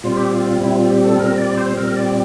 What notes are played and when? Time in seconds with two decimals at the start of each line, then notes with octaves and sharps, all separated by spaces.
0.03 A#2 G3 C4 F4
0.17 G4
0.30 F4
0.61 A#2 G3 C4 E4
0.76 F4
0.90 G4
1.04 A4
1.19 A#2 G3 C4 A#4
1.38 D5
1.58 C5
1.77 A#2 G3 C4 A#4
1.97 D5
2.08 D5